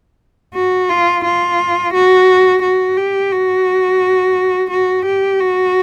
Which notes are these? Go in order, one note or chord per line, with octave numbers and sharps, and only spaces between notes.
F#4
F4
F4
F#4
F#4
G4
F#4
F#4
G4
F#4